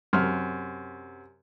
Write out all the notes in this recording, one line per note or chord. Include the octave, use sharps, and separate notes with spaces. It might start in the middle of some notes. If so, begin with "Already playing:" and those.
F#2 C3 C6 F6